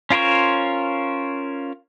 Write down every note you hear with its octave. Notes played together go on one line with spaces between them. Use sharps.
C#4 F4 A#4 C5 C#5